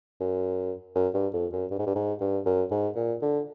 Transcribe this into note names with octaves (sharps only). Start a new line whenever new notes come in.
F#2
F#2
G2
F2
F#2
G2
G#2
G2
G#2
G2
F#2
G#2
A#2
D3